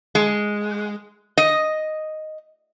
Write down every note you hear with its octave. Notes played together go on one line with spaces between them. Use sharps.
G#3
D#5